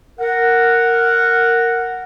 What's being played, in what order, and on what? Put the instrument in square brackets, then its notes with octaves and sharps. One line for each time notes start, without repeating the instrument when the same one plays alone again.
[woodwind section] A#4 F#5